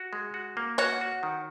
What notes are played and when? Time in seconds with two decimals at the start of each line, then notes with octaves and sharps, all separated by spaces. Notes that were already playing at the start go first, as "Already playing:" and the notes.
Already playing: F#4
0.13 G#3
0.34 F#4
0.57 A#3
0.78 F#4 C#5 F#5
1.01 F#4
1.23 D#3